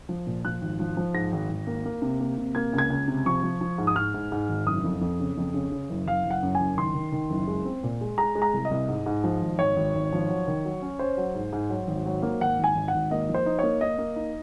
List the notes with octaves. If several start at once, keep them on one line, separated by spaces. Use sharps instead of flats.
F3
A#2
F3 F#6
G#1
F3
F3
G#2 A#6
G#1
G#1
A#3
A#3
C3
A#3
C3
A#3 G#6
C#2
G#6
C#2
C3
F3 C#6
F3
F3
G#2
D#6
G#2 F6
G#2
G#2
G#1
F#1 D#6
F2
F2
C#3
F2
C#3
C#3
F#1
F#1 F5
F#1
F#5
F#2
G#5
F#1
D#3 C6
D#3
D#3
F#1
G#3
C4
A#2
G#3
G#3 A#5
G#3
A#5
C2
D#5
C2
G#2
G#2
F3
G#1
G#1 C#5
G#1
G#1
F3
F#3
D#3
F#3
C#4
C#4 C5
F#3
G#2
G#2
F#3
G#1
F#3
A#3
G#1 F#5
G#1 G#5
G#1
F#5
G#1
A#3 D#5
F3
C5
D#4
A#3 C#5
A#3 D#5
A#3
D#4